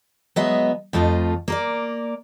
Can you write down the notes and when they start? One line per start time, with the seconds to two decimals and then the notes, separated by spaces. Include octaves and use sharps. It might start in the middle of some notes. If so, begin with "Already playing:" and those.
0.36 F#3 G#3 B3 D#5 E5
0.93 F2 A3 F4 C5 D#5
1.48 A#3 A#4 D5